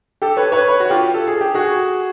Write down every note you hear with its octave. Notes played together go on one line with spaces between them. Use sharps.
G4 A4
B4 C#5
B4 C#5
B4 C#5
F#4
F4 G4
A4
G#4
G4
F#4 G#4